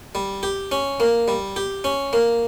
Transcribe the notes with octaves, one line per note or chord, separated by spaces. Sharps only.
G3
G4
C#4
A#3
G3
G4
C#4
A#3